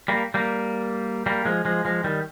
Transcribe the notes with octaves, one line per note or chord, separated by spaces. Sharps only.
G3 A#3
G3 A#3
G3 A#3
F3 G#3
F3 G#3
F3 G#3
D#3 G3